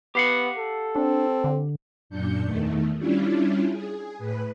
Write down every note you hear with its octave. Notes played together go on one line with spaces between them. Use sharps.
B3 G4 F5 F#5
A4
C4 D4
D3
F#2 A#2 D4 G6 C#7
E2 D#3 A3
G3 C#4 D4 E4 F4
G#4
A2 B4